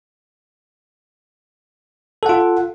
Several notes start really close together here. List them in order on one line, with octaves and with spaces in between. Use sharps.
A4 F#5 F4